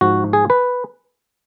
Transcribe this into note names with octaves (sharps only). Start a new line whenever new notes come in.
G#2 F3 F#4
G#4
B4